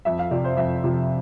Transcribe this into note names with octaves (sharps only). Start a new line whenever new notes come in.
F2 E5
F5
C3 F3 D5
C5
F2 E5
C3 F3